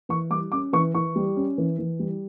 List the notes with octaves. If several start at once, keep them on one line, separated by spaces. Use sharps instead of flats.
E3 C#6
G3 D6
C#4 D6
E3 C#6
E3 C#6
G3
C#4
E3
E3
G3